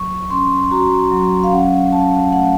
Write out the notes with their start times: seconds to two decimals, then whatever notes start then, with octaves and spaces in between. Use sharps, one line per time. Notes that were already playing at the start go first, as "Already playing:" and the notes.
Already playing: F#3 C#6
0.30 C#4 C6
0.71 F#4 A#5
1.12 F#3
1.44 F5
1.52 C#4 F#5
1.92 C#4 A5
2.32 A3 F#5
2.41 F5